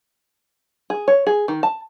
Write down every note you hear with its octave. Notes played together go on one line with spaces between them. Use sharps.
G#4
C#5
G#4
D#3
A5